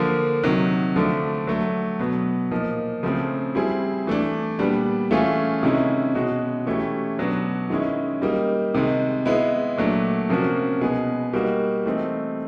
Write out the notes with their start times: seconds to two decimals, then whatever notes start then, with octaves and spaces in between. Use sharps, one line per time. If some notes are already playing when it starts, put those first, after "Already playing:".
Already playing: D3 F3 A#3
0.44 C3 D#3 F#3
0.96 D3 F3 A3 D4
1.47 F#3 A3 D4
1.99 B2 F#3 B3
2.51 A#2 F3 A#3 D#4
3.03 C#3 F3 A3 C4
3.55 G3 C4 E4 G#4
4.07 E3 A3 D4
4.59 A#2 G3 B3 D4
5.11 E3 A3 C#4 F4 G#4
5.63 C3 D#3 G#3 C#4 E4
6.15 B2 G#3 C#4 F#4
6.66 E3 A3 C#4 E4 G4
7.18 B2 F#3 B3 D4 F#4
7.70 D#3 G#3 C#4 E4
8.22 G3 A#3 D#4
8.74 C3 D#3 G#3
9.25 G#3 B3 E4
9.78 A#2 F#3 A3 D4
10.29 C3 F3 A#3 C#4 F#4
10.82 B2 G#3 B3 D#4 G#4
11.33 G3 A#3 D#4 F#4
11.86 E3 A3 C4 D#4